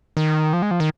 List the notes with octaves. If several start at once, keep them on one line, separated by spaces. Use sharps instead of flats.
D#3
F3
G#3
F3
D#3